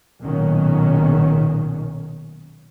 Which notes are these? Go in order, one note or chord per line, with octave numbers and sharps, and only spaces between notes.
B1 A#2 D#3 F#3 C#4